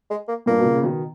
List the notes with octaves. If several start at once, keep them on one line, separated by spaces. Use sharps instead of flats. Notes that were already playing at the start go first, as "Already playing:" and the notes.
G#3
A#3
G2 A#2 A#3
B2
A#2 C#3
C#3
B2 D#3